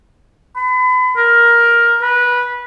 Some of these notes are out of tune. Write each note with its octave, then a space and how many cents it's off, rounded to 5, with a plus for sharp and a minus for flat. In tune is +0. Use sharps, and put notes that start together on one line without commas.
B5 +35
A#4 +10
B4 -15